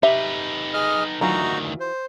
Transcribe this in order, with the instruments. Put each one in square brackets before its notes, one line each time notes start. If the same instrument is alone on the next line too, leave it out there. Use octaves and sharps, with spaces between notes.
[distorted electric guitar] D#4 B4 [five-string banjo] G4 E5
[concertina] G#4 D#5 F6
[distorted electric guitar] D2 D#3 [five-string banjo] E3 F#3 F4 [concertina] D#4 F#4 A#5
[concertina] C5